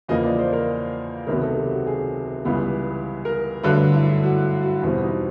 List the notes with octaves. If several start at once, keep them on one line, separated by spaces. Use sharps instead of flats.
E2 C#3 F3 A#3 D#5
D5
C5
A#4
C#2 C3 D#3 F#3 B3 A#4
A4
G4
F#4
G#4
C#2 C#3 E3 G3 B3
A#4
G2 D3 F#3 A3 B4
E4
E4
F#4
F#4
E2 B2 G3 C4 E4
D#4